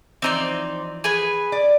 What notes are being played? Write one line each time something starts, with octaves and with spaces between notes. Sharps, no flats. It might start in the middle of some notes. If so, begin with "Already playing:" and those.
E3 F3 C4 D#4 C5 D5
G#4 B4 G#5
D5